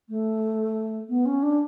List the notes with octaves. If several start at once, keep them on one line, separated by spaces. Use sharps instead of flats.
A3
B3
C#4
D4